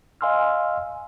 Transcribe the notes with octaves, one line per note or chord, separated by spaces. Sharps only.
D#5 F5 G#5 C6 E6 F6